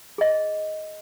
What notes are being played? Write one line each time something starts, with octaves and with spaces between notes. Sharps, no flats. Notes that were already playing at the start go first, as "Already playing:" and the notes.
G#4 D#5